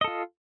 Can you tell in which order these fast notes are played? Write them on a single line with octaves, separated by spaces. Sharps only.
D#5 A4 F4